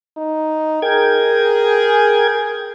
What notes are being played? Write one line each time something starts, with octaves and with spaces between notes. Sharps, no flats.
D#4
G#4 A#4 G5 G#6